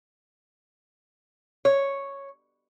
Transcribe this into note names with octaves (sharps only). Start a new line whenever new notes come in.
C#5